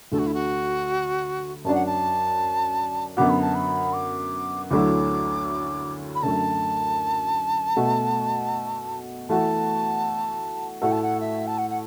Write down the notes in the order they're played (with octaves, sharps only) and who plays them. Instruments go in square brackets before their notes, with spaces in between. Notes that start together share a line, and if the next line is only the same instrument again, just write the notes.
[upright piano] D2 D3 A3 [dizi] A4
[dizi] F#4
E4
F#4
[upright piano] F#2 F#3 D4 [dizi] A5
[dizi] F#5
A5
[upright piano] F#2 D3 B3 F#4 [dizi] D6
[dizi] B5
A5
B5
D6
[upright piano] D2 D3 F#3 A3 E4 [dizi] D6
[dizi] B5
[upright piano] F#2 D3 A3 [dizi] A5
[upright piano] B2 A3 F#4
[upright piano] E3 A3 F#4 [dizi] A5
[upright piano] A2 A3 F#4 A4 [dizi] F#5
[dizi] A5
F#5
E5
A5
F#5
F#5